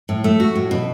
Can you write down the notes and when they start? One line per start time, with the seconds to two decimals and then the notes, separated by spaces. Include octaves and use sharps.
0.09 A2
0.24 A3
0.40 F#4
0.55 A2
0.71 B2